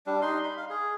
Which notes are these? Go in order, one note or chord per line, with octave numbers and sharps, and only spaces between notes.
G3 D4
D#4 C6
B5
F5
G#4